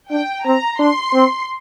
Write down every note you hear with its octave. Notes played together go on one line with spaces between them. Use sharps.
D4 G5
C4 A#5
D4 C6
C4